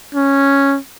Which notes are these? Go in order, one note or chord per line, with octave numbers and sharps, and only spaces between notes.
C#4